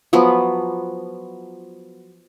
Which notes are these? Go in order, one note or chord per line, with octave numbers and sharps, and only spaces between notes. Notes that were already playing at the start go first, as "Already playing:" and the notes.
F3 F#3 B3